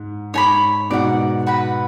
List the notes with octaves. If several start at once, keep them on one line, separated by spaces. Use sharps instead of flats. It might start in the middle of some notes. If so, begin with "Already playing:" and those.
Already playing: G#2
G#2 C#5 G#5 B5 D6
G#2 B2 D5 F#5 C#6
F#4 B4 F#5 B5